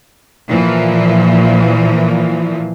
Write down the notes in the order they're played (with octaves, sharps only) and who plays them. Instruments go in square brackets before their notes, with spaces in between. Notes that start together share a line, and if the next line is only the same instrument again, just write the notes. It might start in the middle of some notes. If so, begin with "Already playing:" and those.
[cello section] A#2 E3 F3